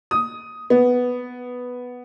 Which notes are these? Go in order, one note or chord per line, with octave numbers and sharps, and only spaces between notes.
D#6
B3